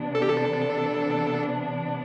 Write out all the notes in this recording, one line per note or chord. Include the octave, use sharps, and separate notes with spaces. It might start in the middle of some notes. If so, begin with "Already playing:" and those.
Already playing: C3 E3 B3 D4
A4
G4
A4